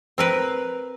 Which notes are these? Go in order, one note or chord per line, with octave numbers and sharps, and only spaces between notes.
C4 A#4 B4